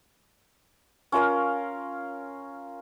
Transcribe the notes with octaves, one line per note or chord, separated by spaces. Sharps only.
C#4 F4 A#4 F5